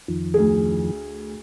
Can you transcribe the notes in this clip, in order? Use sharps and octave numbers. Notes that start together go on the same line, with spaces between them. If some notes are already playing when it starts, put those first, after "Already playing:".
F2 D#3 F3
D2 G#4